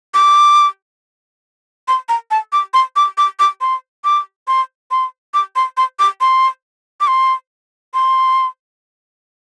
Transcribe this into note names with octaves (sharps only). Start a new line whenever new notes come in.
D6
C6
A#5
A5
D6
C6
D6
D6
D6
C6
D6
C6
C6
D6
C6
C6
D6
C6
D6
C6
C6